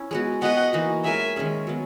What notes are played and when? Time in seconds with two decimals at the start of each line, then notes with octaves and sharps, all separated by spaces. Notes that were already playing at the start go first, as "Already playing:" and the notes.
Already playing: C#4 E4
0.11 G#3 B3 F#4
0.42 B3 F#4 B4 D#5 F#5
0.73 E3 A#3 D#4 F#4
1.04 G#3 D#4 A#4 C#5 E5 G#5
1.36 D#3 G#3 C#4 G#4
1.67 F#3 B3